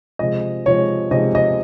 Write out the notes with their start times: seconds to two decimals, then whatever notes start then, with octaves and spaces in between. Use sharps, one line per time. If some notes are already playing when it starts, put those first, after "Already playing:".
0.19 C3 F3 G#3 D#5
0.66 C3 F3 G#3 C#5
1.11 C3 F3 G#3 D#5
1.35 D#5